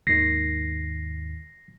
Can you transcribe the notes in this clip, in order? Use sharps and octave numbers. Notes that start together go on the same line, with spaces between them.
D#2 G#2 D#3 A#6 C7